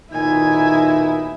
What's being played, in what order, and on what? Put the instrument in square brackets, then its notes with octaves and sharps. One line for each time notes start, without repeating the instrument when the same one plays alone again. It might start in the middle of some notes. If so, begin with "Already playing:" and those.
[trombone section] B1 A#2 D#4 [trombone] D#3 [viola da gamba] E4 [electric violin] G#5